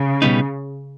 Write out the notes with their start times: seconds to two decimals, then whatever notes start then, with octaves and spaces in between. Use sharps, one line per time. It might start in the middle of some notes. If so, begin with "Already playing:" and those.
Already playing: C#3
0.22 B2 G3 B3 D#4